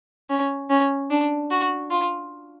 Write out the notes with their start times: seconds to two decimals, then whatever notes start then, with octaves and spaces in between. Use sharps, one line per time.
0.30 C#4
0.70 C#4
1.11 D4
1.51 F#4
1.91 F4